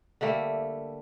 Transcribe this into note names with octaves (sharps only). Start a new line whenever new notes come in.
D3 G3 A3 A#3